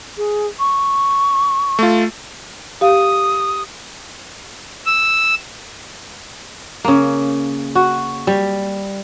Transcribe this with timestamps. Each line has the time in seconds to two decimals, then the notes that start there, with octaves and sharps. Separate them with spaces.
0.17 G#4
0.59 C#6
1.79 A3 F4
2.81 G4 F5 D#6
4.86 E6
6.84 C#3 A#3
7.75 F#4
8.27 G3